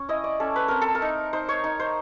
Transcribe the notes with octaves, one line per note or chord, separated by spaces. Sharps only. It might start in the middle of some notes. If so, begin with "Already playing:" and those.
Already playing: C#4
E4 D#5
D5
C#4 A4
B4
C4 A#4
A4
A#4
D#4
D#4 C5
C#5
D#4
C5